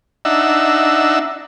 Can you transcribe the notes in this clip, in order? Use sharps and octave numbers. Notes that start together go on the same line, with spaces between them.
D4 D#4 E5 F#5 E6